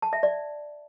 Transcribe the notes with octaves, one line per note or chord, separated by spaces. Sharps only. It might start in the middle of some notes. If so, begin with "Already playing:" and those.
A5
E5
D5